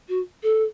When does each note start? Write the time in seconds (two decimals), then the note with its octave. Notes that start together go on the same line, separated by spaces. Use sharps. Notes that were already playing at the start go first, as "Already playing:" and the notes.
0.09 F#4
0.43 A4